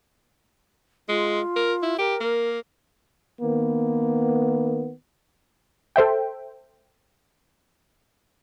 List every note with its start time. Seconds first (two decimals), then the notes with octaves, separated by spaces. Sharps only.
1.09 G#3 F4
1.56 A#4
1.83 E4
1.99 G4 A#4
2.20 A#3
3.42 D#3 A#3 B3
5.96 A4 C5 E5 G5